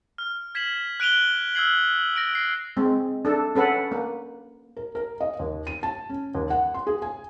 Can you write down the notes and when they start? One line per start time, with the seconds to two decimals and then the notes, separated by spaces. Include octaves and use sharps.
0.18 F6
0.55 G#6 B6 C7 E7 F#7
1.00 F#6 D7 D#7 F7 G7
1.55 E6 F6 G#6 C7 F#7
2.16 A#6 D7
2.35 C7
2.77 G#3 C4
3.25 D4 A4
3.55 C#4 A4 B4 F#5
3.92 A#3
4.77 A#4
4.95 A#4
5.21 D#5
5.39 D#2
5.67 D#7
5.83 A5
6.10 C#4
6.35 D#2
6.50 F#5
6.74 C6
6.87 G#4
7.02 G#5